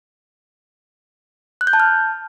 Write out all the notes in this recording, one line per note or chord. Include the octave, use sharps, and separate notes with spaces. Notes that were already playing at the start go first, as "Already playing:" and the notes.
F#6
G6
A5
F6